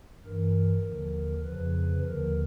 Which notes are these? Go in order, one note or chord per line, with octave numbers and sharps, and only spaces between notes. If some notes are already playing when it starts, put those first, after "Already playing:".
G2 E3 A#4
D#2 D3 F3
F2 C#3 F3 B4
D#2 D3 F3 A#4